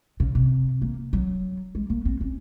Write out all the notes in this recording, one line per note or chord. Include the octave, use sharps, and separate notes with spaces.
C#3
C3
A#3
F#3
G#3
A#3
C4
C#4